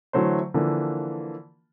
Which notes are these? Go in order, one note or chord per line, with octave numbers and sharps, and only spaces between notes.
D3 E3 F#3 A3 C5
D3 E3 F3 A#3